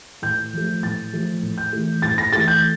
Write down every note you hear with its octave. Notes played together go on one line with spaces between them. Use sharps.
A2 G6
F3 A3
A2 A6
F3 A3
A2
G6
E3 A3
A2 A6
A#6
E3 A3 A6
G6